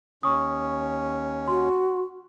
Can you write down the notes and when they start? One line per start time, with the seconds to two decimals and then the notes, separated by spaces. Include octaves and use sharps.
0.23 D#2 C#4 C#6 D#6
1.48 F#4 C6